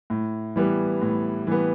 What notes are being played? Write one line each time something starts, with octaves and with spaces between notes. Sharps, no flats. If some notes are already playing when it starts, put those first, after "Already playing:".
A2
E3 G3 B3
A2
E3 G3 B3